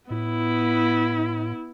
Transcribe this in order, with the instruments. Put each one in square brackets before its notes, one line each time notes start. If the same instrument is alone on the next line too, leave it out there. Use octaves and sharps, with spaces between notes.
[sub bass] A2 [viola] B3 E4